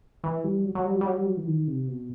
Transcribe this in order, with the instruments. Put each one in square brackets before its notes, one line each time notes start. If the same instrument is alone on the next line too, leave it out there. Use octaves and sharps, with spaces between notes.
[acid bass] E3
G3
F#3
F#3
G3
F#3
G3
F#3
G3
F#3
E3
D#3
C3
B2